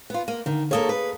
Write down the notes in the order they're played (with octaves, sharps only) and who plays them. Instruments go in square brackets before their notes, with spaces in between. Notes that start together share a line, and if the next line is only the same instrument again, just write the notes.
[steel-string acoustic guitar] B3 F4
A#3
[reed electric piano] D3 [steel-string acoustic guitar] D#3
[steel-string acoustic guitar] A#3 A4 C#5 [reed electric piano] G#4 F5 D#6
[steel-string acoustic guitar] B4